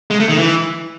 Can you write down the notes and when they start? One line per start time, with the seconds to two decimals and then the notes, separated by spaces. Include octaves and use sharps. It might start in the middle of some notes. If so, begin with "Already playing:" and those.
0.11 G#3
0.20 A3
0.29 D#3
0.38 E3